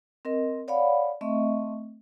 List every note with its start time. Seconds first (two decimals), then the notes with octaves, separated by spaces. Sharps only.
0.25 C4 A#4 D#5
0.68 C#5 D5 F5 F#5 B5
1.21 A3 C4 D#5 E5 C#6